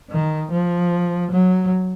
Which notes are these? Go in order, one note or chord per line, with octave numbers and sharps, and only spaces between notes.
D#3
F3
F#3